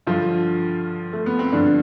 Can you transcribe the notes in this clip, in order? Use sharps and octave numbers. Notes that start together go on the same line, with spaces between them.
G2 D3 F3 F4
A3
B3
C4
G2 D3 F3 D4